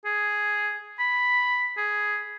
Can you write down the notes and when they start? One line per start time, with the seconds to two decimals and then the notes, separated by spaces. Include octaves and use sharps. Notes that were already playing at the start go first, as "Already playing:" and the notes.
0.06 G#4
0.99 B5
1.77 G#4